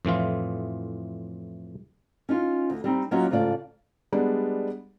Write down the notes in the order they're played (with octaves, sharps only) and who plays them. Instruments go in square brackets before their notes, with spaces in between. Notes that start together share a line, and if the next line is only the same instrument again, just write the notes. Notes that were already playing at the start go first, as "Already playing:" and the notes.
[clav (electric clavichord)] F2 A2 E3 F4
[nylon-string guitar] C#4 D#4 F4
D2
G3 C4 D#4
F#3 A#3 C#4 F4 F#4 D#5
G#2 C#3 A3 F4 D5
[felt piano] G3 G#3 B3 D4